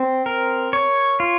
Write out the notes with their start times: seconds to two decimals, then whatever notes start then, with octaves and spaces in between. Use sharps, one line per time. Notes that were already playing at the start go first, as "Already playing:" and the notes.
Already playing: C4
0.26 A#4
0.73 C#5
1.20 F4